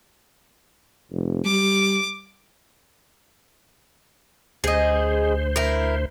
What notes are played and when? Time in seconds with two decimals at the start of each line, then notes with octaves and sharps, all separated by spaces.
1.11 F1
1.45 G3 D6
4.64 D2 G#4 C5 D#5
5.56 E4 A#4